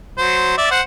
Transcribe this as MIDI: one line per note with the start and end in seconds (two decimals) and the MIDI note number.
0.18 0.56 54
0.18 0.56 72
0.58 0.71 74
0.58 0.71 76
0.71 0.81 72
0.71 0.81 78